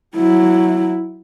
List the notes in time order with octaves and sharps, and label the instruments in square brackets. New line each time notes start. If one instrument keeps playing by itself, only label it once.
[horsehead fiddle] F#3 E4